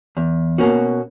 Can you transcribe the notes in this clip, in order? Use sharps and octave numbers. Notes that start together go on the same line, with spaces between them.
E2
B2 A#3 C#4 F#4